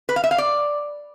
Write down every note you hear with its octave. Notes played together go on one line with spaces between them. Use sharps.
B4
F5
E5
F5
D5